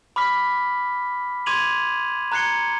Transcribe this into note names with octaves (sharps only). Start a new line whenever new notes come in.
B5 D6 F6 B6
C6 D6 G#6 D#7 F7 F#7
A#5 F#6 G#6 C7 C#7 G7